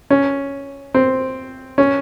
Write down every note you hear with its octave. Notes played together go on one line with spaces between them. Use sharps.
C#4
C4
C#4